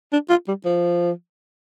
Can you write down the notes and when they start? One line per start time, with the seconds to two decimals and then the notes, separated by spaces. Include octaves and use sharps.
0.13 D4
0.30 F4
0.48 G3
0.65 F3